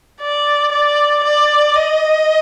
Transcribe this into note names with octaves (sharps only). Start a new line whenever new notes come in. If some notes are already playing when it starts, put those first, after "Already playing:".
D5
D5
D5
D#5